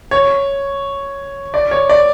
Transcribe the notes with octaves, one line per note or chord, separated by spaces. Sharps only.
C#5
D5
C#5
D5